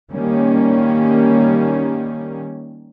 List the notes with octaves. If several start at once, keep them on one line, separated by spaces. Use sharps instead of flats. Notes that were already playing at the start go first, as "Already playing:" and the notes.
D#3 G3 A#3 C#4